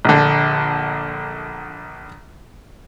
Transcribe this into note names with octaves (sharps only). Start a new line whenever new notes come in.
A#1 D3